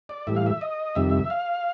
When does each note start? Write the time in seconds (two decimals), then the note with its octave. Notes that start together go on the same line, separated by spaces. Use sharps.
0.09 D5
0.27 A2 E3 G3 E5
0.36 F5
0.46 E5
0.61 D#5
0.95 F2 C3 D#3 G3 E5
1.30 F5